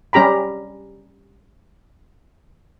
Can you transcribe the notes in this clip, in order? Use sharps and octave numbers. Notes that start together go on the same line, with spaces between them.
G3 C#4 G4 A#5 B5